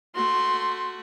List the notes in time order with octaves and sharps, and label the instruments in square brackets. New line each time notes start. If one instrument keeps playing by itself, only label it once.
[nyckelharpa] A3 F#4 [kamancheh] C6